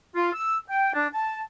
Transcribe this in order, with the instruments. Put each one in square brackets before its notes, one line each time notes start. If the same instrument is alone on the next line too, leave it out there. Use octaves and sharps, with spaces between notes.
[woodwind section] F4
E6
G5
D4
A5